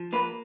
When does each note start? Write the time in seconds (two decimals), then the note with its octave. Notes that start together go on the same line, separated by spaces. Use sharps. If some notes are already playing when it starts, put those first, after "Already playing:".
Already playing: F3
0.13 A#3 B4